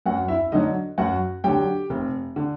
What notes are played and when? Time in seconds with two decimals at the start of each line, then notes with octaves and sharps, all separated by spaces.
0.06 F#2 F#4 F#5
0.28 E4 E5
0.52 D3 F#3 D#4 D#5
0.98 F#2 F#4 F#5
1.44 D3 F#3 G4 G5
1.90 F1
2.36 D3